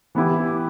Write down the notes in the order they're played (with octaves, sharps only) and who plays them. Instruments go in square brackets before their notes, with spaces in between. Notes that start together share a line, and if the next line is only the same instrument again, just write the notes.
[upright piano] E3 B3 E4 G4